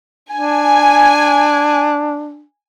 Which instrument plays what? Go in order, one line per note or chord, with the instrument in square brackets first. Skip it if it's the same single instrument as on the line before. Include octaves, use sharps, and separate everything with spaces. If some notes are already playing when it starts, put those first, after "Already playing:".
[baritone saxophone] D4 [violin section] G#5